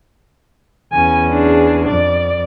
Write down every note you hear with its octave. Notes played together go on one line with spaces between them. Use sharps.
E2 C#4 G#5
D4 G#4
F2 D5